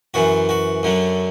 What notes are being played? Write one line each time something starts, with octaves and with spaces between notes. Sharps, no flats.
F#2 E3 F#4
F#4
F#2 D3 F#3